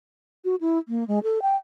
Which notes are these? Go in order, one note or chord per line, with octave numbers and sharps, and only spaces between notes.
F#4
E4
A#3
G#3
A4
G5